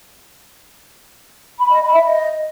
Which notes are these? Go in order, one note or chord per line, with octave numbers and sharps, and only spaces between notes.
B5
D#5
B5
E5
D#5